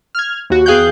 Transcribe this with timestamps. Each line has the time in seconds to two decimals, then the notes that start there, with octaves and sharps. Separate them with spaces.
0.15 F6 G#6
0.50 D#2 F#4
0.66 E2 G#4 F5 G5 F#6 G6